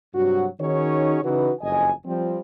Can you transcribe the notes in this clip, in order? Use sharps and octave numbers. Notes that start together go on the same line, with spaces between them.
G2 C3 F#3 F#4
D#3 C#4 D#4 F#4 G#4 C#5
C#3 E3 D#4 F#4 B4
F#1 F2 D#5 G#5
F3 G3 C4